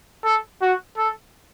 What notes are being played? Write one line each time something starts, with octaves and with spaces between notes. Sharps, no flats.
A4
F#4
A4